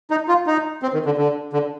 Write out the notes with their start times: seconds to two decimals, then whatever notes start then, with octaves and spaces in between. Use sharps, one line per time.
0.10 D#4
0.28 F4
0.47 D#4
0.82 C4
0.93 D#3
1.06 D3
1.17 D3
1.53 D3